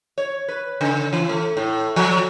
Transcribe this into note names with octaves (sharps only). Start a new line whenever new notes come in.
C#5
B4
C#3
E3
A3
A2
F3